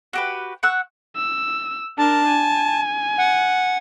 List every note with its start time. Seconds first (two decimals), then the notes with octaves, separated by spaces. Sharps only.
0.13 F#4 G4 B4
0.63 F#5 C#6 E6 F#6
1.16 E6
1.98 D4 A#4 A5
2.28 G#5
3.18 F#5